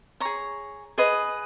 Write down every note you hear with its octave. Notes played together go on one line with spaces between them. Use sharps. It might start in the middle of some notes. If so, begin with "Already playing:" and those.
G#4 C#5 A#5
G#4 B4 D#5